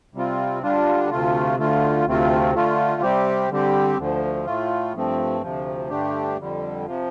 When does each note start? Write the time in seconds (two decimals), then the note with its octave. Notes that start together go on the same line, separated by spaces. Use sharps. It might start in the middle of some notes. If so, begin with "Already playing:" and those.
0.14 C3 G3 C4 F4
0.63 D3 G3 D4 F4
1.10 D2 C3 A3 F4
1.57 D2 D3 A3 F4
2.05 D2 C3 A3 C4 F4
2.53 D3 A3 F4
3.02 C3 G3 C4 G4
3.50 D3 G3 C4 G4
3.97 D2 D3 F3
4.46 A2 A3 F4
4.94 G2 F3 A3 C4
5.41 D2 C3 F3
5.89 G2 D3 A3 D4 G4
6.38 F2 D3 G3
6.85 C3 F3